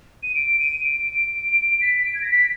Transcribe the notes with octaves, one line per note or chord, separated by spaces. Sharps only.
D#7
D7
D#7
D7
B6
D7
G#6
A#6
B6